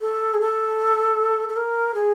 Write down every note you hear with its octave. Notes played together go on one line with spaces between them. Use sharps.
A4
G#4
A4
A4
A#4
G#4